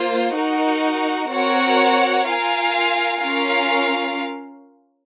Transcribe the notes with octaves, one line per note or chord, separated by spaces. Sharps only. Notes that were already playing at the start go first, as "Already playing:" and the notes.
Already playing: A#3 F4 C5
D#4 F#4 A#4
C4 F#4 A#4 C#5 F#5
F4 A#4 F5 G#5
C#4 F4 A#4 F5